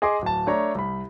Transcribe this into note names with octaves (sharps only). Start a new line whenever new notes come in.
G#4 D#5 G#5 C6 D6
D1 A5
A3 D4 C#5 A#5
C2 B5